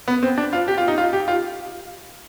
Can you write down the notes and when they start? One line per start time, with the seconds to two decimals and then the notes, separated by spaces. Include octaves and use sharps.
0.08 B3
0.23 C4
0.38 D4
0.53 F4
0.68 G4
0.78 F4
0.88 D#4
0.98 F4
1.13 G4
1.28 F4